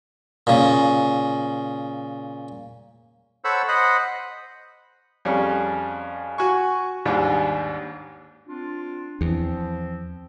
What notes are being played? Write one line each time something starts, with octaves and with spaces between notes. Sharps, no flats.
A#2 C#3
A4 C5 C#5 F#5 B5 E6
C5 D#5 F#5 B5
F2 G3 C#4 G#4
F#4 G#5 C#6
D#2 G#2 G3 D4 G#4
C4 D4 F4
E2 F3 C4